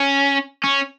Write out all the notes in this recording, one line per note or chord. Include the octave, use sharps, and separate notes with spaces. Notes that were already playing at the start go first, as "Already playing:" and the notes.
Already playing: C#4
C#4